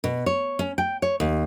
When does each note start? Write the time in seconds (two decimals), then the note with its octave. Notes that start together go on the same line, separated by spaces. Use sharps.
0.04 B2
0.26 C#5
0.59 C#4
0.78 G5
1.02 C#5
1.20 D#2